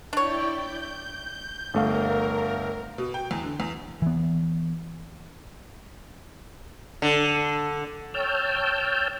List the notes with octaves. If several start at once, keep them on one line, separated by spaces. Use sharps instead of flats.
D4 E4 C#5 D5 G5
G6
G1 A3 A#4 F5
B2
G5
E2
D3
E2
E3 B3
D3
C#5 G5 A5 E6 F6 G6